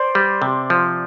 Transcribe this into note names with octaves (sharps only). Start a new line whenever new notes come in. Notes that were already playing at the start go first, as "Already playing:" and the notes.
Already playing: C5 D5
G3
C3
F3